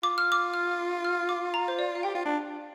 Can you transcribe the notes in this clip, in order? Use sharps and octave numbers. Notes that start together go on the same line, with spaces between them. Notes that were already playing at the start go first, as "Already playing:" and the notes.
F4 D6
F6
D6
F6
F6
D6
A#5
C5
D5
F5
G4 G5
F4
D4